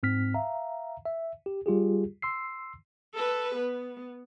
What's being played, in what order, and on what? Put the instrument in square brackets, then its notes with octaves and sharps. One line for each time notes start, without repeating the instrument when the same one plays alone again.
[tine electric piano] G#2 C4 F6 B6
E5 F5 A#5
E5
G4
G3 F4 G4 G#4
C6 E6 C7
[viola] A4 B4
B3